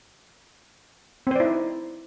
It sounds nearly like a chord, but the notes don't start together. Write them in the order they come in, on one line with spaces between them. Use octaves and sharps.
C4 C5 D5 E4 D#4